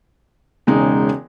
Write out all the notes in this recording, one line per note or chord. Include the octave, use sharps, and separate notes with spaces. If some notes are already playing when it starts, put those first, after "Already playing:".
E1 C#3 G#3 D#4